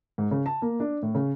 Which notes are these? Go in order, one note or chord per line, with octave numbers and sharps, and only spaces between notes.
G#2
C#3
A5
A#3
D4
A2
C#3